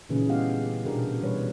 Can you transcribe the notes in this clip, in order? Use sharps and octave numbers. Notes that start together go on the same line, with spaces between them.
A#2 C#3 E3 C#4 D#4 G#4
G3 B3 G4 D#5 F5 F#5
B3 G4 B4
B2 D4 G4 G#4 A#4
B2 E3 G3 B4 C#5